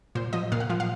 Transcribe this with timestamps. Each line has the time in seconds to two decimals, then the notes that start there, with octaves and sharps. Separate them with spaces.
0.15 A#2 C5
0.33 F3 D#5
0.52 A#2 F5
0.60 F#5
0.69 F3 F5
0.80 F5